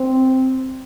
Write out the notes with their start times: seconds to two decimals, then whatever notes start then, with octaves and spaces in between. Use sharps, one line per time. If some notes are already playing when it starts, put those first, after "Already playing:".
Already playing: C4